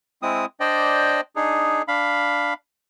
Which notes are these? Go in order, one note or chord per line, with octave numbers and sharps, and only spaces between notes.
G#3 C4 E4 D#6
D4 C5 D5 D#5 G5
D4 D#4 G#4
D4 F5 B5